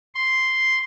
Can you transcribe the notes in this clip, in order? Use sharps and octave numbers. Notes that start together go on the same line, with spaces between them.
C6